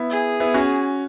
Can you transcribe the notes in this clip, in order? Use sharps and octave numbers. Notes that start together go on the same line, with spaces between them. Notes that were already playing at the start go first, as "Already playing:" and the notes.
Already playing: B3 E4
G#4
B3 E4
C#4 F#4